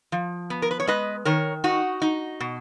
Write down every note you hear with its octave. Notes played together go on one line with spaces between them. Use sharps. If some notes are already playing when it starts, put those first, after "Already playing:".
F3
B3
A#4
B4
C#5
G#3 B4 D#5
D#3 A#4 C#5
D#4 F#4
D#4
B2